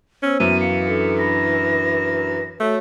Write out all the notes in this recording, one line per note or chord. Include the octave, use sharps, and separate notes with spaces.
B3 C#4 C5 E6
F#2 E3 B3 E5 D#7
F5 C#7
D4 A4
D4 B5 A#6
A3 F#4 C#5 E5